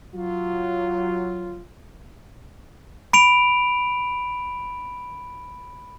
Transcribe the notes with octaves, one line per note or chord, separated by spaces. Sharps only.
F#3 F4
B5 D7 F7